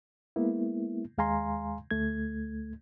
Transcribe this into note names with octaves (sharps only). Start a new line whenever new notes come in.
G#3 A#3 B3 E4
D#2 G#3 F5 G#5 A#5 C6
D2 A3 G#6